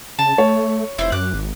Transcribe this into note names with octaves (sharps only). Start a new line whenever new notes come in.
C#3 A5
A3 C#5
F1 E4 C5
F#2 D6 F#6
G#1